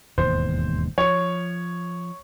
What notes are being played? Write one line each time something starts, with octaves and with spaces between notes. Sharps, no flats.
E1 D#2 G#2 C5
F3 C#5